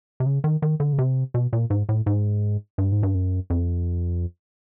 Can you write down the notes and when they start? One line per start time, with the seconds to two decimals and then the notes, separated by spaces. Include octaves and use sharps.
0.20 C3
0.26 C#3
0.44 D#3
0.62 D#3
0.80 D3
0.93 C#3
0.98 C3
1.34 B2
1.53 A#2
1.70 G#2
1.89 A2
2.06 G#2
2.78 G2
2.92 G#2
3.03 G2
3.15 F#2
3.50 F2